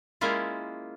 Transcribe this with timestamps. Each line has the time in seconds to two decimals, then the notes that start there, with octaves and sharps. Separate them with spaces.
0.21 G#3 A#3 C#4 E4 F4